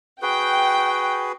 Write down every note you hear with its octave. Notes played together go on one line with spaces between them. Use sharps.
F#4 G#4 B4 G5